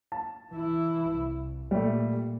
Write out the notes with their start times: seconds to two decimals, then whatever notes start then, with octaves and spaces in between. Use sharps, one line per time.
0.12 A5
0.52 E3 E4
1.15 C2
1.71 A#2 G3 A3